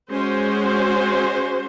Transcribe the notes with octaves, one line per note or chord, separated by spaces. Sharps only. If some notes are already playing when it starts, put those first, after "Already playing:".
G#3 C#4 F#4 C5